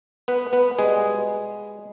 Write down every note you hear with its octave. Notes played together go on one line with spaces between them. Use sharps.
B3 B4
B3 B4
B2 G3 G#3 B3 G#4